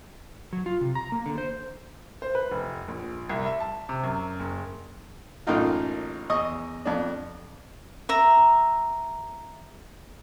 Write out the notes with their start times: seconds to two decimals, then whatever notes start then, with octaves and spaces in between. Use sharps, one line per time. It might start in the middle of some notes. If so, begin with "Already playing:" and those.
0.53 F#3
0.66 F4
0.81 C3
0.95 A#5
1.12 A#3
1.26 D3
1.38 C5
2.22 C5
2.35 B4
2.51 F1
2.88 A#1
3.29 C2
3.46 E5
3.60 A5
3.89 C3
4.03 F#2
4.39 F#1
5.47 A1 F#2 A2 A#3 D#4 F4
6.29 E2 D#5 C#6 D#6
6.85 F2 D4
8.09 E5 A#5